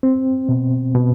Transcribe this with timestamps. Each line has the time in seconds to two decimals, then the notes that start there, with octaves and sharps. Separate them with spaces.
0.03 C4
0.49 B2
0.95 B2